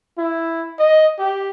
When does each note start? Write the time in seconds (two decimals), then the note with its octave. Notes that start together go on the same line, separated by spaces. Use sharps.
0.18 E4
0.79 D#5
1.19 G4